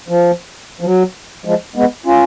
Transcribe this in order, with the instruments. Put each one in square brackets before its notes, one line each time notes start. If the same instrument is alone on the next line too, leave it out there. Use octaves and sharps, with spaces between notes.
[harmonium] F3
F3
F#3
F3 G#3
G#3 B3
C#4 F4